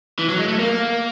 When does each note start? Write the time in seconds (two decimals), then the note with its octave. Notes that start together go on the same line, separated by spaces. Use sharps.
0.19 E3
0.29 F#3
0.39 G#3
0.48 A3
0.59 A#3